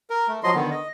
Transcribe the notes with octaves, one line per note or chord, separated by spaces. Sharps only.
A#4
A3
F3 F#3 D#5 C6
D3 D#3 B3
D#5